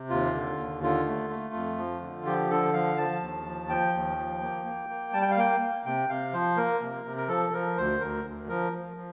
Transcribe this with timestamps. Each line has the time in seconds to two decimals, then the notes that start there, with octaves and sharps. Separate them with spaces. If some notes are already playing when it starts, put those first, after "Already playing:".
Already playing: C3
0.10 D#2 F4
0.34 D3
0.58 D#2
0.83 D3 F4
1.06 A3
1.30 A3
1.54 F2
1.78 F3
2.01 D3
2.26 F3 G4
2.50 D3 A4
2.74 F3 F5
2.97 F3 A5
3.21 D#2
3.46 F3
3.69 F3 G5
3.94 D#2
4.18 F3
4.42 A#3
4.65 A#3
4.89 A#3
5.13 G3 A5
5.22 G5
5.31 F5
5.37 A#3 G5
5.61 A#3
5.85 C3 G5
6.09 C3 F5
6.33 F3 C5
6.57 A#3 A#4
6.81 C3
7.05 C3
7.17 A#4
7.28 F3 A4
7.53 F3 A#4
7.77 D2 C5
8.01 D2 A#4
8.25 D2
8.49 F3 A#4
8.72 F3
8.97 F3